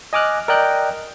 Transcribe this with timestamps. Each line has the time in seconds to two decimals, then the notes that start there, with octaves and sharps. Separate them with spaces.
0.13 D#5 G#5 D6 F6 F#6
0.48 A#4 D5 D#5 G5 F#6 G6